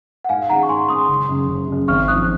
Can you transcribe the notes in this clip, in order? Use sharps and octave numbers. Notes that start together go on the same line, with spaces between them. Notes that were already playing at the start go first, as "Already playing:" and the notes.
F#5
G#2 F5 G#5
D#3 G#3 C#4 F#5 A#5
C#6
G#2 G#5 C6
D#3 G#3 C#4 C6 D#6
F#1
F#2 C#3
F#1
F#2 C#3
G#1 C#6 F6
G#2 F3 D#6 F#6